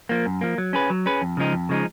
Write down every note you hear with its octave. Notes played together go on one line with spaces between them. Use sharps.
F3 A#3
F#2
F3 A#3
F#3
C#4 G#4 B4
F#3
C#4 G#4 B4
F2
C#3 F3 G#3 D#4
F2
C#3 F3 G#3 D#4